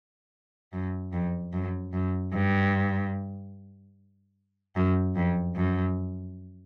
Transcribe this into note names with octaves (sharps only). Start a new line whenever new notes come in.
F#2
F2
F#2
F#2
G2
F#2
F2
F#2